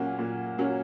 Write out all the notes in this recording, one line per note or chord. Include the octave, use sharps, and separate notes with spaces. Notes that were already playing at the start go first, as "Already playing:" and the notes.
Already playing: A#2 F#3 A#3 C#4 F#5
A#2
F#3 A#3 C#4